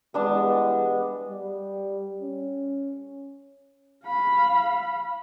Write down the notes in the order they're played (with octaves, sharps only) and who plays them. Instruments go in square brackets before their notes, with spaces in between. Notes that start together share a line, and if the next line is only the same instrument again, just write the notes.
[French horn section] E3 G3 G#3 [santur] B3 D4 A5
[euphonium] G3
C#4
[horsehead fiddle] F5 B5